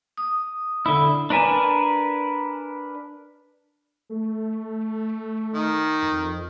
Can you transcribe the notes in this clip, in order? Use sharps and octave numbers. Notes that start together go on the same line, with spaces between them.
D#6
D3 E4
D4 A#4 B4 G#5 A5
A3
D#3
F2